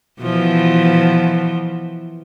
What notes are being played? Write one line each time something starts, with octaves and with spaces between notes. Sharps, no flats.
B2 E3 F3